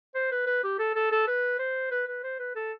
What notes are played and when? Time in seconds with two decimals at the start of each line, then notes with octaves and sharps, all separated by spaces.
0.14 C5
0.31 B4
0.46 B4
0.64 G4
0.79 A4
0.95 A4
1.12 A4
1.27 B4
1.59 C5
1.91 B4
2.07 B4
2.23 C5
2.39 B4
2.56 A4